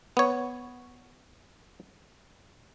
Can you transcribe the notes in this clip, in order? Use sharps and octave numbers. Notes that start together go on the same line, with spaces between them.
B3 C#5